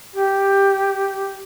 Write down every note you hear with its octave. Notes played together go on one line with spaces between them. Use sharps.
G4